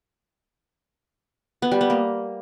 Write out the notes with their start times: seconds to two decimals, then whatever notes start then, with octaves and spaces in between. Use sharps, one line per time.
1.62 B3
1.71 G3
1.81 B3
1.90 A#3